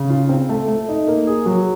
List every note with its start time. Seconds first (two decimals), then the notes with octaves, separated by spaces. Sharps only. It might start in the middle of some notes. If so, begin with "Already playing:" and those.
Already playing: C#3
0.10 F4
0.29 C4
0.49 A3
0.68 A3
0.89 D#4
1.08 A#3
1.27 G#4
1.46 F#3